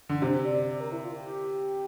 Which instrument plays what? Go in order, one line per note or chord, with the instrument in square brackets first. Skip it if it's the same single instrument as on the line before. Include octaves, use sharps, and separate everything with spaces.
[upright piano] D3
[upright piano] C3 [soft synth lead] C5
[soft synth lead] D5
D5
A#4
E4
F4
G4